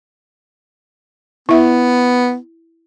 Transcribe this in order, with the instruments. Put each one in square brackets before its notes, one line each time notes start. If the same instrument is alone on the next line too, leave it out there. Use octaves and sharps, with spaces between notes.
[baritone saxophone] B3 [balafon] E4 E5